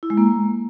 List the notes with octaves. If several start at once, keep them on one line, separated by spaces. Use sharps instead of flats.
E4
G#3
A#3